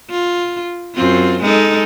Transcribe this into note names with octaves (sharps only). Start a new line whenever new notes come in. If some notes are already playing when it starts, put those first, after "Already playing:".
F4
F#2 C4 F4
G#3 D#4 A4